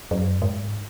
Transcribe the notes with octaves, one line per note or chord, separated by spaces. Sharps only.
F#2
G#2